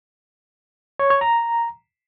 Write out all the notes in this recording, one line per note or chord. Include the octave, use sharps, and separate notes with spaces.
C#5
C#5
A#5